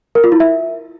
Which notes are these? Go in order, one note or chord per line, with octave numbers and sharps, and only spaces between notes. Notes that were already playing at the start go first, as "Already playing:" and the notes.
A#4
F4
E4
E5